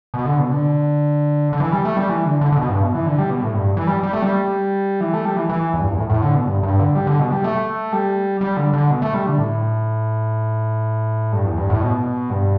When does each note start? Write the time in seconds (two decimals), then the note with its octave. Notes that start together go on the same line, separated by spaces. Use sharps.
0.14 B2
0.26 D3
0.39 B2
0.51 D3
1.53 D3
1.60 E3
1.72 G3
1.85 A3
1.97 G3
2.09 E3
2.25 D3
2.41 D3
2.52 D3
2.57 B2
2.69 G2
2.82 B2
2.95 E3
3.06 D3
3.19 G3
3.30 B2
3.43 A2
3.54 G2
3.77 E3
3.87 G3
4.03 G3
4.13 A3
4.22 G3
5.01 E3
5.13 A3
5.25 G3
5.37 E3
5.49 E3
5.74 E2
5.81 G2
5.89 E2
5.98 A2
6.10 A2
6.22 D3
6.35 B2
6.47 G2
6.63 G2
6.79 D3
6.95 G3
7.07 D3
7.19 B2
7.31 G3
7.44 A3
7.93 G3
8.41 G3
8.57 D3
8.73 D3
8.90 B2
9.02 A3
9.14 G3
9.27 D3
9.38 A2
11.32 G2
11.45 E2
11.57 G2
11.70 A2
11.81 B2
12.30 G2